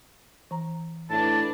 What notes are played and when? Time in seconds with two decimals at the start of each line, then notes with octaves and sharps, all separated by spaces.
0.51 E3 A#5
1.10 A2 D4 B4 A5